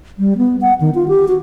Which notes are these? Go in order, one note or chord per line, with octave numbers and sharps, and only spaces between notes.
G3
B3
F#5
D#3
F4
G4
F#4